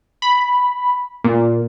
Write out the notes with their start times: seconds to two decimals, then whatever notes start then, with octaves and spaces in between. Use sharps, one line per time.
0.22 B5
1.24 A#2